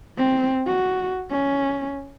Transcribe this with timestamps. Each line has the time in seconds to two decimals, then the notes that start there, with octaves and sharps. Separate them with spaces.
0.18 C4
0.67 F#4
1.31 C#4